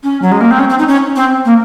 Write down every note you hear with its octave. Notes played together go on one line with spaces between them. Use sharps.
C#4
F#3
G#3
A#3
C4
C#4
C4
D#4
C#4
C4
A#3